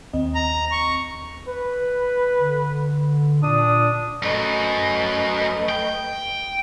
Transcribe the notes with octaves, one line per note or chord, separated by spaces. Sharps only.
D#2 C4 D#5
A#5
C#6
B4
D3
A#2 D4 D#6
F#2 A3 B4 D#5
G5